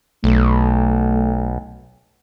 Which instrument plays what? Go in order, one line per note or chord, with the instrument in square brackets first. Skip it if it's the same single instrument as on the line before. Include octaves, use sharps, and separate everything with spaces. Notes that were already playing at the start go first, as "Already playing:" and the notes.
[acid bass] B1 [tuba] A3